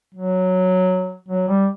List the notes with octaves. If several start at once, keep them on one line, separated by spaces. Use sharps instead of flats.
F#3
F#3
G3